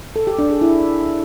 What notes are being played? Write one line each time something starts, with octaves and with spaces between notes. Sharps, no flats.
A4
G4
D4
G#4
E4